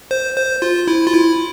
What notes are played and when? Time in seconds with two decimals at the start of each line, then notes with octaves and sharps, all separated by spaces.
0.11 C5
0.37 C5
0.62 F4
0.88 E4
1.07 F4
1.14 E4